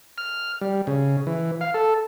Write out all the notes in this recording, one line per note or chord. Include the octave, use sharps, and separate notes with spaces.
F6
G3
C#3
E3
F5
A4